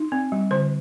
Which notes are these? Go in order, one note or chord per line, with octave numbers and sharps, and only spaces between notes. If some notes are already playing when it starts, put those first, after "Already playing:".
Already playing: D#4
C4
G3
D3 C5